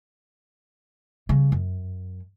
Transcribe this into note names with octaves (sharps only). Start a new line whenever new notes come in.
C#3 G3
F#2